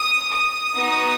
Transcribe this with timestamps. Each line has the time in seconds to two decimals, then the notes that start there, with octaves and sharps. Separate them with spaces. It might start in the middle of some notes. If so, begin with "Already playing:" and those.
Already playing: D#6
0.31 D#6
0.75 B3 D#4 F#4